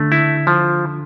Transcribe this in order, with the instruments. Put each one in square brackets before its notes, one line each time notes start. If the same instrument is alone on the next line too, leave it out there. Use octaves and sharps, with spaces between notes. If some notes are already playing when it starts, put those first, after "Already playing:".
Already playing: [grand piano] D3 [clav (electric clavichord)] A3
[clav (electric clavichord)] E4
F3